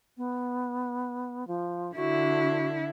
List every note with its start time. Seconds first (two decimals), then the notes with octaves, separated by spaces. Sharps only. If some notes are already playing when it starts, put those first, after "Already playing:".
0.17 B3
1.47 F3
1.96 D3 E4 F#4